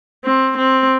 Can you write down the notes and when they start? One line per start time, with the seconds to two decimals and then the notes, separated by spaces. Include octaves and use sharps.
0.24 C4
0.57 C4